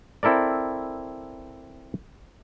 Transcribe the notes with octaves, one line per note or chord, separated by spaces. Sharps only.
C4 E4 A4 A#4 D5